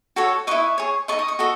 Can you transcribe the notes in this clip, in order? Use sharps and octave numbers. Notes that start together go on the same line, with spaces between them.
F#4 A4 C#5
E4 B4 D#5 C#6
G#4 C#5
D#4 A4 D#5 C#6
D#6
C#6
F#4 A4 D#5